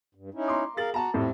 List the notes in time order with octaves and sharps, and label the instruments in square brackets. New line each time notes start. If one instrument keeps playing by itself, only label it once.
[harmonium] G2
C#4 D#4 E4
[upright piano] A#5 C6 D6
[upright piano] G#4 A6 F#7 [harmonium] A#4 F5
[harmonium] F#4 [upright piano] A5 A#5
[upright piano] F2 A2 G3 [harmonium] C4